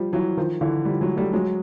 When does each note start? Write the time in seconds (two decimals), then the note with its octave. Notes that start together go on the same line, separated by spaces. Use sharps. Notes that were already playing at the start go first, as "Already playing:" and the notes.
Already playing: F3 G3
0.13 E3 F#3
0.37 D#3 F3
0.61 D3 E3
0.85 F3 G3
1.01 F#3 G#3
1.17 G3 A3
1.33 F#3 G#3